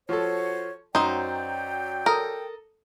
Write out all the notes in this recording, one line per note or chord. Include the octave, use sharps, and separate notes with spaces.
F3 F#4 A4 C5 C#5
F#2 F#3 D#4 C5 D5 G5
A4 A#4 D#6